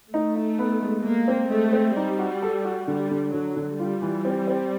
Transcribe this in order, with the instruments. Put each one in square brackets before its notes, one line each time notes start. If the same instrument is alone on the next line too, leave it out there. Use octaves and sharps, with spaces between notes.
[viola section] A3 [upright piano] D#4
[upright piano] D#4
B3
G#3
[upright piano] G#3 [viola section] A#3
[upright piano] C4
[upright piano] G#3 [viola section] A3
[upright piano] C4
[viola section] G3 [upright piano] D#4
[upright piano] F#4
A4
F#4
[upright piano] D3 [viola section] G3
[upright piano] D3
[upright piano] D3 [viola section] F#3
[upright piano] D3
[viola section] G3 [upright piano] F4
[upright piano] E3
C4
C4